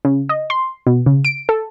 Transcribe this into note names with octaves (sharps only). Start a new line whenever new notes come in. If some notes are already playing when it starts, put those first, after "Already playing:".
C#3
D#5
C6
B2
C#3
D7
A4